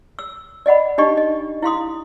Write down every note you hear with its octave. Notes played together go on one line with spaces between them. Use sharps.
E6
D5 D#5 F#5 B5
D4 D#4 G4 D#5 C#6
D#5
E4 F5 C6 D#6